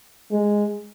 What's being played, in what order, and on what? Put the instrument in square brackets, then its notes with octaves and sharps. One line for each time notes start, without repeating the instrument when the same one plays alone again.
[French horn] G#3